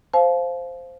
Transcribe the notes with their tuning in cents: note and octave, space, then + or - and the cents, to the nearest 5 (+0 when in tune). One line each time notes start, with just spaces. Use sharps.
C5 +0 F5 +0 A5 -35